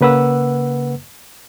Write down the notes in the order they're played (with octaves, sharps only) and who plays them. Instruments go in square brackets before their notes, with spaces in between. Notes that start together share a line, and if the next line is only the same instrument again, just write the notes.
[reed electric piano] C#3 A#3 B4 F#5 E6